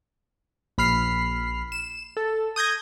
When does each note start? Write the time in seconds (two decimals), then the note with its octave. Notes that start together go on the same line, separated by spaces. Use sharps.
0.78 A#1 B5 F6 C7
1.72 E7
2.17 A4
2.56 D#6 G6 G#6 A#6